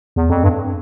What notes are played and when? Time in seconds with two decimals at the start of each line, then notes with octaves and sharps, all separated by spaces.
0.16 E2
0.30 F2
0.43 G2